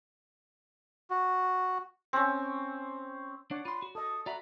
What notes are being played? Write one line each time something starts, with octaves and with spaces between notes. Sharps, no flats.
F#4
C4 C#4
D4 C#5 D5 F#5
F4 B5 C6
F#4
A4 D#5 D#6
F#4 D5 E5 A#5 B5